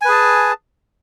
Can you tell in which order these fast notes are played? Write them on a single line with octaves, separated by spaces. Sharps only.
G#5 B4 G#4 A5